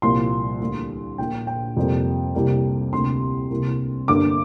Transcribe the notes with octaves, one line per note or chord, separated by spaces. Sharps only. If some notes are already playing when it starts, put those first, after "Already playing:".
C2 A#2 F3 A#3 C6
D2 D3 A#3
A#1 A#2 A#3 G5
G5
F2 C3 G3 A#3
C2 C3 G3 A#3
D2 C3 A#3 C6
C2 C3 A#3
G1 G2 D3 A#3 D6